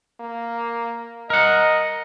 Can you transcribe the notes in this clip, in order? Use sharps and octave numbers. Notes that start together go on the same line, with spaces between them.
A#3
A#4 D#5 F#5